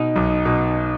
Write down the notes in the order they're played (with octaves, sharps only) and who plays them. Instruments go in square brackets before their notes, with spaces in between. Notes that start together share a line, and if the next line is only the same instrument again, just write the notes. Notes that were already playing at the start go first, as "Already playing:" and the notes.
Already playing: [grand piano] B2 [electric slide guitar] D#4
[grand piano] B1
B2